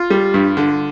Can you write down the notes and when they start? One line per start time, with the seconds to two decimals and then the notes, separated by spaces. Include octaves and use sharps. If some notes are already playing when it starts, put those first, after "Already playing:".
Already playing: F4
0.10 G3
0.34 G2
0.57 D3